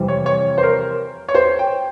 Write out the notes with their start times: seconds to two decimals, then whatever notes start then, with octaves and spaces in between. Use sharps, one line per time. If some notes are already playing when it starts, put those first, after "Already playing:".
Already playing: F2 C3 E3 G3
0.08 C#5
0.26 C#5
0.58 C5
0.63 A#4
1.29 C#5
1.35 C5
1.59 G5